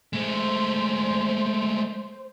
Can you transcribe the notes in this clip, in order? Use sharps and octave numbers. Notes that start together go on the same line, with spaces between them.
G#3 A3 C5